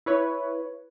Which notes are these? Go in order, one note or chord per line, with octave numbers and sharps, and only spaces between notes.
E4 B4 C#5